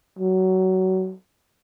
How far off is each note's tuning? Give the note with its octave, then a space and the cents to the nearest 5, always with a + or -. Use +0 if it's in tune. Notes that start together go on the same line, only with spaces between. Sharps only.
F#3 +20